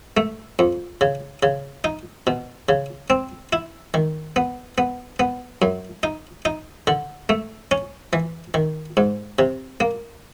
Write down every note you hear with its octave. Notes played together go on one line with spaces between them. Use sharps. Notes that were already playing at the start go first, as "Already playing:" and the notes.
A3
F2
C#3
C#3
D#4
B2
C#3
C4
E4
D#3
B3
B3
B3
F#2
D#4
D#4
D3
A3
C#4
E3
D#3
G#2
C3
A#3